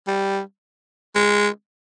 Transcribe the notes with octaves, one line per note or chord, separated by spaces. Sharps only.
G3
G#3